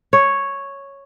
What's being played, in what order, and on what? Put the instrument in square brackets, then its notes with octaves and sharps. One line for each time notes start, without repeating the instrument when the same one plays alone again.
[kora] C#5